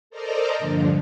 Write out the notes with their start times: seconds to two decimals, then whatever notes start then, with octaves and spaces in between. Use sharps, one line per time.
0.10 A4 A#4 C5 D5 D#5 A#5
0.58 G2 A#2 D3 F3